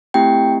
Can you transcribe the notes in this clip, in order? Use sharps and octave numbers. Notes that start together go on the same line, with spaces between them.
A3 C4 E4 G4 G5